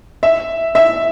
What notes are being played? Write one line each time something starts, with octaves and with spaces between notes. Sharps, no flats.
E5
E5